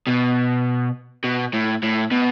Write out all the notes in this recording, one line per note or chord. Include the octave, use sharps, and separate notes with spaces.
B2
B2
A2
A2
B2